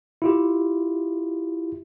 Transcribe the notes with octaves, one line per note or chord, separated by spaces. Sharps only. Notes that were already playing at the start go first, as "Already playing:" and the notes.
E4 F4 G4